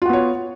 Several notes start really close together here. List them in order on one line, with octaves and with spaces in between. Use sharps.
F4 F#4 B3 C#5